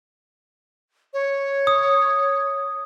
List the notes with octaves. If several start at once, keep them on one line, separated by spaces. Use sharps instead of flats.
C#5
D#6